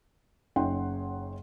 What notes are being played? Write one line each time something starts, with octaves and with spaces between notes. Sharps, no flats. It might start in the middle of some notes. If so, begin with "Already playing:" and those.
F#1 C#4 D#4 F#5 G5 C6